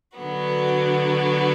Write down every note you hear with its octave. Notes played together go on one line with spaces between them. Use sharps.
D3 F#3 B3 F#4